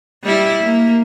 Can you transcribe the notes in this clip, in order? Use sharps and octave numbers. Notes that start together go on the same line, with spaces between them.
G3 E4
A#3